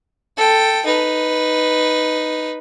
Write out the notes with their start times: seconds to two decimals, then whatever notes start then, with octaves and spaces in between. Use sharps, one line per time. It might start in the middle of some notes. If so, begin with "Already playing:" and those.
0.37 A4 G5
0.85 D#4 B4